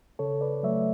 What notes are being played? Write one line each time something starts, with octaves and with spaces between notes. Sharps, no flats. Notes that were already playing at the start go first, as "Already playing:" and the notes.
C#3 A4 C#5
B4 D5
F#3 A3 C#5 E5